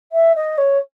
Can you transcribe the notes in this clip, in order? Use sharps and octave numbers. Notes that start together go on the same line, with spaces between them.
E5
D#5
C#5